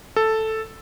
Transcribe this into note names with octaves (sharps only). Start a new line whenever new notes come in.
A4